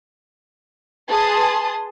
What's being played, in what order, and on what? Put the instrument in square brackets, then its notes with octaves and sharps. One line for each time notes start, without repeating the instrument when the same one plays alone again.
[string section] G#4 B4 A5 C6 D#6